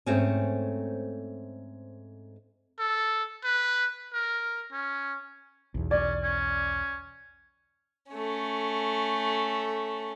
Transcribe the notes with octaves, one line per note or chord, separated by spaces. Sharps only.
G#2 A3 C4 C#4
A4
B4
A#4
C#4
B1 E2
C#4 D5
C#4
A3 C#4